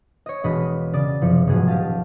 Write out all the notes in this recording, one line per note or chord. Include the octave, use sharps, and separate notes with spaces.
C#5 D#5
E1 B2 D#5 B5
C#3 D5 D#6 A6
F#1 C3 F3 C#7
D#1 G#2 B2 F3 F#3 G#4
G4 D#5 F5 A5